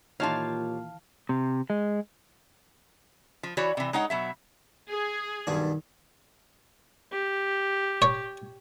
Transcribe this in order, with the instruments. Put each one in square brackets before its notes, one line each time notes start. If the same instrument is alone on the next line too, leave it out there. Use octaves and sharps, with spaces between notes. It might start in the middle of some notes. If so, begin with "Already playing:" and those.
[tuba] A#2 [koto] D#3 E3 [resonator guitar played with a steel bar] F4 G4 C#5 [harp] F5 A5
[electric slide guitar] C3
G#3
[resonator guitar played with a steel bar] F3
E3 F#4 C#5 D5
C3 E3
G#3 D#4 C#5 F#5
B2 F#3 E5
[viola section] G#4
[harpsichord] B1 G2 D4 [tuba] D#3
[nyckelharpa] G4
[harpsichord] C#5